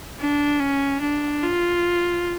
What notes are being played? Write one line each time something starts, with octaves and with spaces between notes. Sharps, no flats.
D4
C#4
D4
F4